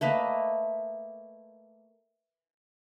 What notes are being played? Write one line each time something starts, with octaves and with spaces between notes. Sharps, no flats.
A3 A#3 B4 D#5